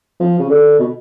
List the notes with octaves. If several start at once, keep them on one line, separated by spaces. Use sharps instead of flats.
F3
C#3
D3
B2